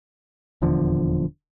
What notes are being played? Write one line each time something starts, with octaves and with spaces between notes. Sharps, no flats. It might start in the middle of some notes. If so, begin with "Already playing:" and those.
D#1 E2 D3 F3